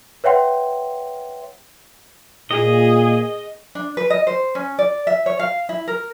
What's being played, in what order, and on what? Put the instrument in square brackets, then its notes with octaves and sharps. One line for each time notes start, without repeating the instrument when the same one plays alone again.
[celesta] B4 C#5 E5 F#5 G5 C6
[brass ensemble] A#2 [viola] G#4 [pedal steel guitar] D#5
[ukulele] D4
B4
D#5
C5
C#4
D5
E5
C#5
F5
E4
A#4